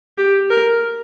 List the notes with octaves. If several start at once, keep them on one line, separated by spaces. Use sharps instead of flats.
G4
A#4